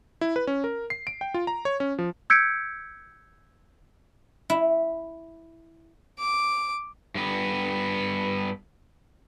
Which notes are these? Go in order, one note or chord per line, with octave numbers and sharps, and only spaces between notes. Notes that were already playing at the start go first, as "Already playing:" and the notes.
E4
B4
C#4
A#4
C7
D7
G5
F4
A#5
C#5
C#4
F3
E6 G6 G#6 B6 C#7 D7
E4
D6
G2 B3